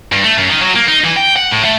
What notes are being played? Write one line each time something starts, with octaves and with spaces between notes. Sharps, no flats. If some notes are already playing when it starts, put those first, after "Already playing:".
G2
A3
F#2
D#3
F#3
A#3
D#4
E3
G5
F#5
A2
A3